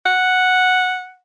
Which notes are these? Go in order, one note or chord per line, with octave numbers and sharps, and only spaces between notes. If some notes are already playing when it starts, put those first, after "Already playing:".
F#5